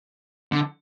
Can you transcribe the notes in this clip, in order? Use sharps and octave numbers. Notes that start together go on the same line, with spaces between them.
D3